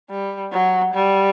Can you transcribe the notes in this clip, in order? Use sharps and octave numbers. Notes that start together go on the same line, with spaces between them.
G3
F#3
G3